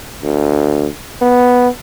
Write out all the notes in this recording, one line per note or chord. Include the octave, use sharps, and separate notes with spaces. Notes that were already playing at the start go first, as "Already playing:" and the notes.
D2
B3